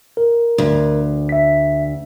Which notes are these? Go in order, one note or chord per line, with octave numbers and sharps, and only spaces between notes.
A#4
D2
E5 B6